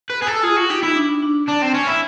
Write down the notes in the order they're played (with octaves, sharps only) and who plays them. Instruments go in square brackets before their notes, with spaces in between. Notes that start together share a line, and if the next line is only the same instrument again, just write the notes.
[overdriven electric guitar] B4
G#4
A4
[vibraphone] F4 [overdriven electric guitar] G#4
[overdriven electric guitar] F#4
[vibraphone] D#4 [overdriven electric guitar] G4
[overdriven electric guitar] E4
[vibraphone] D4
D4
[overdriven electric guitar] D4
C4
C#4
E4